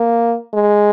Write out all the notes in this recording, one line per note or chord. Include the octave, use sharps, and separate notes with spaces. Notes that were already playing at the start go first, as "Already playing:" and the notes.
Already playing: A#3
G#3